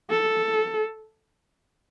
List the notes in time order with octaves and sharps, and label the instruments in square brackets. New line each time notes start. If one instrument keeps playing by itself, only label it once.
[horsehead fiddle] A4